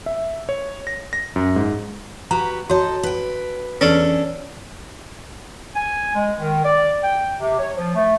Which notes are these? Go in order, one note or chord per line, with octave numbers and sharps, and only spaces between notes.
E5
C#5
A#6
A#6
F#2
G#2
F#4 G4 B4 A#5
F#4 A4 C#5 D#5
B4 G5
E2 C#4 D4 A4 B4
G#5
G#3
D#3
D5
G5
C3
C#5
F3
A3